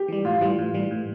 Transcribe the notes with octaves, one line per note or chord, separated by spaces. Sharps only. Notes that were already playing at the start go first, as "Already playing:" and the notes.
Already playing: G4
E3 G3
A2 F4
E3 G3
A2
E3 G3
A2